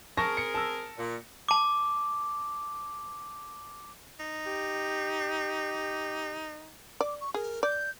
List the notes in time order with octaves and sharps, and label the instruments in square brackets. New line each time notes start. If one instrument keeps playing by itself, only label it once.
[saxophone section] C4 G#4 A#4 [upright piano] A5 C#6 A#6
[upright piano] C#7
A5 E6
[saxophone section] A#2
[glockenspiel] A5 D6
[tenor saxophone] D#4
[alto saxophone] G4
[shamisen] D5 [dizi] D6
[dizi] C#6
[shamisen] G#4 [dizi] A#4
[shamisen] D5 [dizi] G6